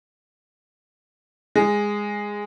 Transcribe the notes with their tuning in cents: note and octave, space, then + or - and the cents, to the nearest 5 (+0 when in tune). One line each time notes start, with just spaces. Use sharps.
G#3 -10